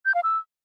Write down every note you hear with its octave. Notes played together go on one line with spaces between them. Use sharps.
G6
F5
E6